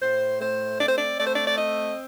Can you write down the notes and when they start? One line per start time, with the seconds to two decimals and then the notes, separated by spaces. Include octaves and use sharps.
0.02 A2 C5
0.41 A3 C5
0.80 C4 D5
0.88 C5
0.97 D5
1.19 A3 D5
1.26 C5
1.35 D5
1.48 D5
1.58 C4 D#5